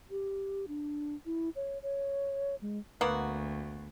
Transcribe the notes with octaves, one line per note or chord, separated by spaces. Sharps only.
G4
D4
E4
C#5
C#5
G#3
D2 A#3 B3 F#4